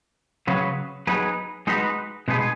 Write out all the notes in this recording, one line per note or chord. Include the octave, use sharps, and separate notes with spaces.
C#3 F#3 C#4 G#4 B4
F#3 B3 D#4 G#4 B4
G#3 D#4 F#4 B4
B2 G#3 D#4 G#4 B4